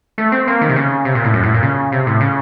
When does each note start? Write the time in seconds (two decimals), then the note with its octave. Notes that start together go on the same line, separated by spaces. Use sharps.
0.18 A3
0.32 C4
0.47 A#3
0.61 D#3
0.69 C3
0.76 C#3
1.05 C3
1.15 A#2
1.24 A2
1.34 F#2
1.43 A2
1.54 A#2
1.63 C#3
1.92 C3
2.07 A2
2.21 C#3